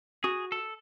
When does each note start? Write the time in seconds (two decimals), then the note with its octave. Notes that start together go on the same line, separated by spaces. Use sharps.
0.24 F#4 G#4
0.52 A4